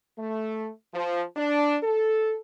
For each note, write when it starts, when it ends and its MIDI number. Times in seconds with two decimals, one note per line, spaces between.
0.19 0.69 57
0.94 1.22 53
1.36 1.75 62
1.83 2.35 69